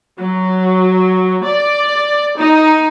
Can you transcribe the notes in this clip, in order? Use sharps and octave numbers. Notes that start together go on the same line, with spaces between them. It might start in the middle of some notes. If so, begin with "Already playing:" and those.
F#3
D5
D#4